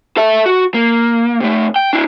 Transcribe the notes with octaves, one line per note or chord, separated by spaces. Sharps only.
A4 E5
F#4
A#3
C3 A3
G5
D4 E4